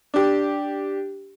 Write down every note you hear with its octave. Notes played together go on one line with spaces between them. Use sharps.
D4 G4